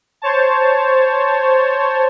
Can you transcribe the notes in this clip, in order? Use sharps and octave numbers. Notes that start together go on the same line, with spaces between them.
C5 C#5 A5